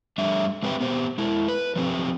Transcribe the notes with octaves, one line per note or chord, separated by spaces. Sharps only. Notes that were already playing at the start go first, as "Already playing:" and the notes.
G3 A3 D4 E5
G#3 C4 G4 B4 E5 G5
B3 G4 C5
G#3 E4
B4
F3 F#3 C4 G4